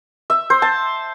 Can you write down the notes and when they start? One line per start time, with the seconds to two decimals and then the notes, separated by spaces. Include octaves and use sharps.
0.30 E5
0.50 C5
0.62 A5